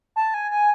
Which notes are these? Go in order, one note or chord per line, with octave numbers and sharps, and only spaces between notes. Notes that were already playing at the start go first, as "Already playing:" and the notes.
A5
G#5
G#5